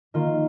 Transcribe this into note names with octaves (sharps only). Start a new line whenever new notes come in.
D#3 A#3 F4